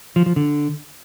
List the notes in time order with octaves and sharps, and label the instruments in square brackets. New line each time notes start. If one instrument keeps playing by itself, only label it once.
[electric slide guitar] F3
F3
D3